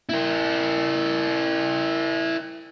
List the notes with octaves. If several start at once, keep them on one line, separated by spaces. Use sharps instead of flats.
E4 A#4